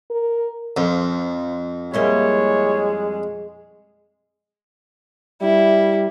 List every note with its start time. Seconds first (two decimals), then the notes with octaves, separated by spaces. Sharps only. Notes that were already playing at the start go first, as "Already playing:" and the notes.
0.11 A#4
0.77 F2 F3
1.94 G3 G#3 A#3 E4 C#5
5.42 G3 E4